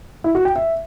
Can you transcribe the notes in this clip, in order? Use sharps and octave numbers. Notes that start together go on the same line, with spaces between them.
E4
F#4
G5
E5